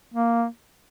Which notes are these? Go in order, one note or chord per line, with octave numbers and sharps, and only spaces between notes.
A#3